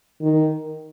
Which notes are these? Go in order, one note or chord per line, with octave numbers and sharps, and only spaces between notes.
D#3